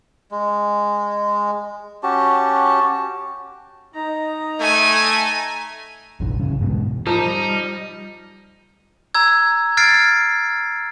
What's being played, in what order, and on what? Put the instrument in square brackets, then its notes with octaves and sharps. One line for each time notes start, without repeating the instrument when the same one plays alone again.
[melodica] G#3
C#4 F#4 G4 A5
[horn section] D#4 [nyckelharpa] A#5
[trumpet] A3 [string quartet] G#5
[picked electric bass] F1 A#1 G2 E3
G1 C#3
G#2 B2 D#3 E3
[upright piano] F3 [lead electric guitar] G3 [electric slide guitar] D#4 [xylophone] A5 A#5
[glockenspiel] A#5 E6 G#6
F6 G#6 A6 C7 D7